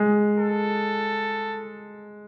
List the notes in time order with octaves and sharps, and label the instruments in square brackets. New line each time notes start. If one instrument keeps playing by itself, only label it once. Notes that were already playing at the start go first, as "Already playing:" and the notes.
Already playing: [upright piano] G#3
[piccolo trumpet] A4